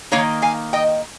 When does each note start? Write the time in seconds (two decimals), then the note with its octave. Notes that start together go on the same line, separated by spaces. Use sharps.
0.11 D#3 A#3 D#4 C#5 F5
0.42 F5 G#5
0.73 D#5 G5